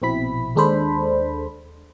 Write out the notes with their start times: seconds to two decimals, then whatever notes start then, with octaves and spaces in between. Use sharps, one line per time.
0.02 A#1 B2 C4 E4 B5 B6
0.56 D#2 G#3 D4 A4 C5 B5